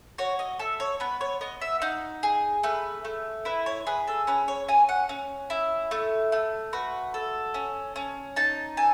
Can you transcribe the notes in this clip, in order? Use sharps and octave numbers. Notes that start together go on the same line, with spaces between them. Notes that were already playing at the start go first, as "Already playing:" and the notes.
F#4 C#5
D#5
A4 E5
C#5
B3 B4
C#5
B3 D#5
E5
D#4 F#5
G#4
A3 B4
A3
E4 B4
C#5
G#4 B4
A4
C#4 B4
C#5
C#4 G#5
F#5
C#4
E4
A3
A3
F#4 B4
A4
C#4
C#4
D#4 A5
A4 G#5